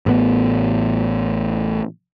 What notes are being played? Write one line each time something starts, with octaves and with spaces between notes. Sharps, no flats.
A1 A2 C#3 B3